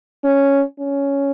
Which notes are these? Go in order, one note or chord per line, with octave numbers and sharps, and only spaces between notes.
C#4
C#4